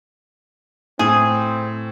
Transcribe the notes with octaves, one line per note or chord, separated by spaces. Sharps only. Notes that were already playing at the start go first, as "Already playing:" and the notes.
A2 C4 G#4